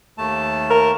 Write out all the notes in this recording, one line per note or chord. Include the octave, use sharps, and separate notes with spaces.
D#2 A3 A5
A#4